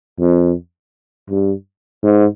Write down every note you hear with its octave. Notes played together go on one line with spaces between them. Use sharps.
F2
G2
G#2